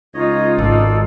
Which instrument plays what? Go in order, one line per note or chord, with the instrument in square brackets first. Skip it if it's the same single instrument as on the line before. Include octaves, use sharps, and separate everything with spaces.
[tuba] C#2 [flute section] D#4 F4 [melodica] C#5 D#5
[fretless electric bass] G#1 [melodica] A4 D5